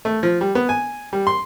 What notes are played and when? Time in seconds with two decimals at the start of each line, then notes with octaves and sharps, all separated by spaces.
0.05 A3
0.23 F3
0.41 G3
0.55 B3
0.69 G#5
1.13 G3
1.27 C6